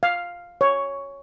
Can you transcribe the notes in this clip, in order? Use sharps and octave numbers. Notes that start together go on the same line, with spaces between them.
F5
C#5